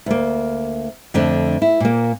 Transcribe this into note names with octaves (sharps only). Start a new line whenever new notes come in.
D2 A#3
F2 D3 A3 D4
E4
A#2 A#3